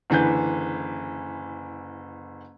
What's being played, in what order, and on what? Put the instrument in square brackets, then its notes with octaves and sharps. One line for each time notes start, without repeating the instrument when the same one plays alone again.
[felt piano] F#1 D3 E3 B4 G6